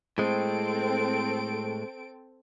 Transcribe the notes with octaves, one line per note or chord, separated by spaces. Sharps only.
A2 G#3 C4 A4 D7